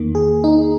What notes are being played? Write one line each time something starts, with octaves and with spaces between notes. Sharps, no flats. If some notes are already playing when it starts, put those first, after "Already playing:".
Already playing: E2 D#3 A#3
G#4
D#4